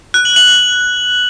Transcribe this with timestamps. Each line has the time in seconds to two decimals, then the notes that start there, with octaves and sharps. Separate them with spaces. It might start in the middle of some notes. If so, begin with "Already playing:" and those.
0.14 F#6
0.25 F#7
0.36 F#7